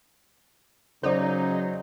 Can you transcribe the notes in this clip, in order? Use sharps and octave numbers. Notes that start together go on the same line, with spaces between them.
C#3 F#3 D#4 C5 D5